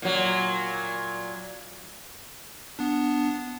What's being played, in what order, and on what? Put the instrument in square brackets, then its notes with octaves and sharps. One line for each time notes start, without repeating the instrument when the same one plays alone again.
[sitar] A#2 F#3
[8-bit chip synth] B3 D4